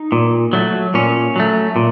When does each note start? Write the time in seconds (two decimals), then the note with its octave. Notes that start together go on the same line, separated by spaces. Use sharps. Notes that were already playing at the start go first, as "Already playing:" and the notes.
Already playing: D#4
0.12 A#2
0.53 F#3 A3
0.94 A#2 C#4
1.36 F#3 A3
1.76 A#2